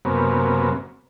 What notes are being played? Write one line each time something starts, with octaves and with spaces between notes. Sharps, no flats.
F#2 C3 A#3 B3 C#4